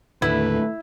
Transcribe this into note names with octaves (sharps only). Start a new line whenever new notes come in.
D#2 A2 D3 A3 E4 B4